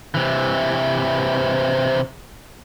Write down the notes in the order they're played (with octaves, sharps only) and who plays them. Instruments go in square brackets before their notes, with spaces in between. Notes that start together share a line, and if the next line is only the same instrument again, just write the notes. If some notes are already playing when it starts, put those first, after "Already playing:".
[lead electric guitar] C3 E3